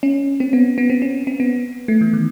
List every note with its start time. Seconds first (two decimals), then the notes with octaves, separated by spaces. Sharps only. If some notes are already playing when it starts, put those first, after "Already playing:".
0.03 C#4
0.40 C4
0.53 B3
0.78 B3
0.90 C4
1.02 C#4
1.27 C4
1.40 B3
1.88 A3
2.01 E3
2.13 D#3